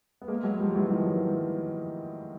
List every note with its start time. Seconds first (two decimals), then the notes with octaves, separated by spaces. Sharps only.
0.22 B3
0.28 G#3 A#3
0.44 F#3 G#3
0.60 F3 G3
0.75 E3 F#3
0.90 D#3 F3
1.07 E3 F#3